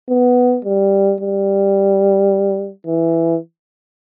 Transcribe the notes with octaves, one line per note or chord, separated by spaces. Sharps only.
B3
G3
G3
E3